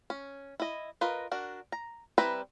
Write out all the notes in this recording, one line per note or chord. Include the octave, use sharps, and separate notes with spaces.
C#4
E4 D#5
F4 A#4 B4 D#5
D4 F#4 A#4
A#5
G3 C4 E4 B4 A#5